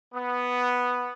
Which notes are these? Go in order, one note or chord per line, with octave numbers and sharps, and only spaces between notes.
B3